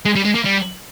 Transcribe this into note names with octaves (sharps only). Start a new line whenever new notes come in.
G#3
G3
G#3
A#3
G3